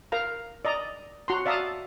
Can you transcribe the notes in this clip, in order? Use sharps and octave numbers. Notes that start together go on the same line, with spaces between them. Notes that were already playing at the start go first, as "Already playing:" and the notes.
A#4 F5 A#5
D5 D#5 A#5
F#4 A#5 C6
D5 E5 F5 A5 A#5 D#6